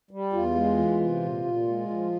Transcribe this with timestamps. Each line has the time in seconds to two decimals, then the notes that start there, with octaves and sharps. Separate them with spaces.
0.11 G3
0.33 E2 F4
0.55 G#3
0.78 E3
1.00 C3
1.22 A#2
1.45 A#2
1.68 G#3
1.90 F3